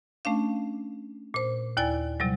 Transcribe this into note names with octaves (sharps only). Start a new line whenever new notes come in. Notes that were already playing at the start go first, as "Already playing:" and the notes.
A3 C#4 D4 F5
A#2 C5
D#2 E4 D5 G#5 A6
C3 F#3 G3